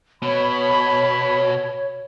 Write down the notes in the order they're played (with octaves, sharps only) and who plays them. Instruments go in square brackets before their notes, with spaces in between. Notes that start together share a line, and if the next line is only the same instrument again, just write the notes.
[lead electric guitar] B2 [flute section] C#5 [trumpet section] B5